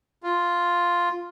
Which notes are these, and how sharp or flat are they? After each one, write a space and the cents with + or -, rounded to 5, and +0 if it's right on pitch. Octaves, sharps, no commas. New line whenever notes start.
F4 +0